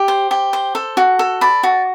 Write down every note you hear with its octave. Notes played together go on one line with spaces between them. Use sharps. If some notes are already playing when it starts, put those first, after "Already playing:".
Already playing: G4
C5
G4
C5
A4
F#4
A4
D5 B5
F#4